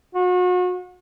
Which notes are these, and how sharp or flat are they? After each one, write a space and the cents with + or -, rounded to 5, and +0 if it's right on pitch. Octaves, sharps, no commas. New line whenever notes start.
F#4 -40